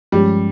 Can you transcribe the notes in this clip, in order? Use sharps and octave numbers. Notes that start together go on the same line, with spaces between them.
G2 F3 G3 G#3 C#4